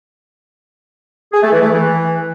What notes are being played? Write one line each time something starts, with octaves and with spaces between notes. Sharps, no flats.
G#4
A3
E3
A3
E3